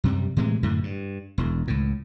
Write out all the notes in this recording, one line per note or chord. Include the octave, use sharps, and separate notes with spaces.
F#2 C3 G3
A2 C3 E3 G#3
F#2 A2 D3
G2
E1 E2
C#2 A2